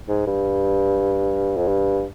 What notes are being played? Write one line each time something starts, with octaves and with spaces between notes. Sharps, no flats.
G#2
G2
F2
G2